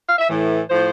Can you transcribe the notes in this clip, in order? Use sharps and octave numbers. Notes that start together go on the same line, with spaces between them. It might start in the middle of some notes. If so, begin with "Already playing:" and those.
F5
E5
A2 E3
A2 F3 C5